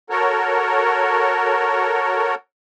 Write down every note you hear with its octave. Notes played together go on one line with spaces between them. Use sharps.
F#4 A4 A#4 C#5